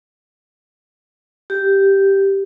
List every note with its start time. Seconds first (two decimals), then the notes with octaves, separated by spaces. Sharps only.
1.50 G4